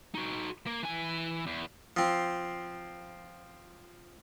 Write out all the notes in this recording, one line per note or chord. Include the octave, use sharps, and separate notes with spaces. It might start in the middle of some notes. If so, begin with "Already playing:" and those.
D#4 F#4
A#3
E3 G#5
E2
F3 C4